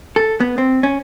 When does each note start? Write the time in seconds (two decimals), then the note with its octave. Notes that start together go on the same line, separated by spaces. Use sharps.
0.16 A4
0.40 B3
0.58 C4
0.83 C#4